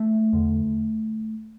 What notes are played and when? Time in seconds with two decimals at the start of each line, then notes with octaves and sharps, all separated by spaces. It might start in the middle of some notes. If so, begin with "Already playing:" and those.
Already playing: A3
0.33 E2 D3